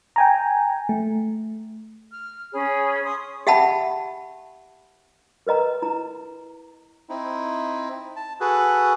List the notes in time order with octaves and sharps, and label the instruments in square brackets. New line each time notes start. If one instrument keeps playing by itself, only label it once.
[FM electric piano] G5 G#5 A#5
A3
[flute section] F6
C#4 G#4 C#5 B5
G#5 C6 C#6 D#6
[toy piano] G4 E5 F#5 G5 A5 B5
A#4 B4 D#5 A#5
E4 A#5
[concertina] C4 D#4 E4
A5
F#4 G#4 A4 B4